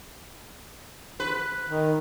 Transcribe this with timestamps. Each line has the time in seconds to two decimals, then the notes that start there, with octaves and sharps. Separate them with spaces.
1.20 B4
1.69 D#3